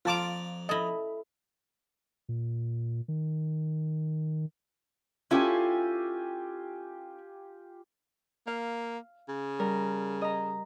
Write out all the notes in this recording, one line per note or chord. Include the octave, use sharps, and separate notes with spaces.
F2 F4 D5 A5 A#5 D6
E4 A4 D#5
A#2
D#3
C#4 E4 F4 G4 A4 G#5
A#3 F5
C#3
G3 A#4
D#5 A#5